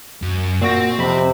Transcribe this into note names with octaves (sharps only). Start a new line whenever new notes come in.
F#2
A#2 C4 F#4 A#6
F2 C3 B5